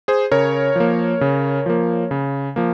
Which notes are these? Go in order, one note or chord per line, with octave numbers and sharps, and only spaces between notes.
G#4 C5
C#3 A#4 C#5
F3 A#3
C#3
F3 A#3
C#3
F3 A#3